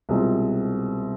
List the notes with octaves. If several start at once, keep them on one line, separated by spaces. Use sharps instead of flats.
C2 B2 G#3 C4 F4